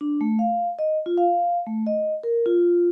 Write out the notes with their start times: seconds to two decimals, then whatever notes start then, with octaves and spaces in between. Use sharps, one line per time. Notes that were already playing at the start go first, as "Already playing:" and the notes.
0.01 D4
0.21 A3
0.39 F5
0.79 D#5
1.06 F4
1.18 F5
1.67 A3
1.87 D#5
2.23 A#4
2.46 F4